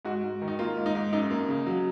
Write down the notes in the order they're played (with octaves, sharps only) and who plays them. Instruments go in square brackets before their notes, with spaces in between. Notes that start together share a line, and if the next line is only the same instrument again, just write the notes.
[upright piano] G#2 F#4
G#2
D#3
D#4
A#3 F4
G#2
D#4
G#2
F#2 D#4
A#3
C#3
F#3